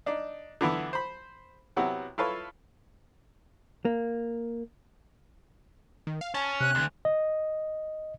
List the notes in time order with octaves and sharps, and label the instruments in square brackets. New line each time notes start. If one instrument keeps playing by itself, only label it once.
[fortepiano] D4 D#4
D3 E3 B3 E4
C5 B5
C3 F#3 B3 E4 F#4
E4 F4 A4 B4 C#5
[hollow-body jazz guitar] A#3
[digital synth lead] D#3
F5
[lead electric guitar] C#4 [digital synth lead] A5
[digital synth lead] C3 [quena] F#6
[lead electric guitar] D2
[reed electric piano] D#5